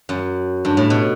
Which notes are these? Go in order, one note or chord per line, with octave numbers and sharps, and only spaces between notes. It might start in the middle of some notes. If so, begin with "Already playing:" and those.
F#2
G2
A2
B2